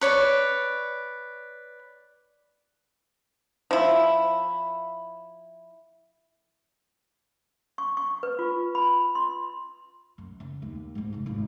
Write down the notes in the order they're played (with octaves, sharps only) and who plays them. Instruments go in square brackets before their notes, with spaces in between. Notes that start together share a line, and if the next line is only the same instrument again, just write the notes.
[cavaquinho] B4 C#5 D5
[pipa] F3 E4
[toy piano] C#6
C#6
B4
F4
B5
C6
[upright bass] F#2
C#3
D#2
G#1 G#2
F1 C2
G#1 F4